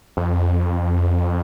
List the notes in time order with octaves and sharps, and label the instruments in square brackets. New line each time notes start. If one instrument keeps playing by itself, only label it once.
[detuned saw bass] F2